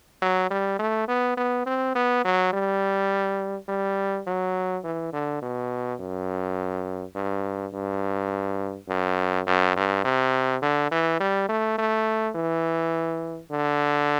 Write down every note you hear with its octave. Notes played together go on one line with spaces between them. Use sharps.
F#3
G3
A3
B3
B3
C4
B3
F#3
G3
G3
F#3
E3
D3
B2
F#2
G2
G2
F#2
F#2
G2
C3
D3
E3
G3
A3
A3
E3
D3